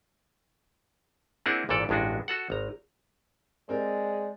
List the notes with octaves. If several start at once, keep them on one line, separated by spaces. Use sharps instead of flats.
A#3 C4 D4 E4 G#4 F#5
G#1 A#2 E3 A4 D5
A1 G2 G#3 D4 F#4
F#4 A4 F#5
G#1 A#5
G#3 C4 A#4 D5